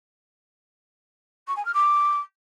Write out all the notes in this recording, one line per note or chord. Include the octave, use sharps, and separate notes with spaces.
C#6
G#5
F6
D6